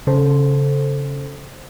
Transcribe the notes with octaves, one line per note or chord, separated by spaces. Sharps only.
C#3 A4 C5